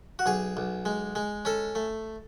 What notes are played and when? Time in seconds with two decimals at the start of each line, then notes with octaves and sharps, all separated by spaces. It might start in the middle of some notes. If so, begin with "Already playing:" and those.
0.19 F#4
0.26 B1 G#4
0.57 B1
0.85 G#3
1.15 G#3
1.45 C#4 A4
1.75 A3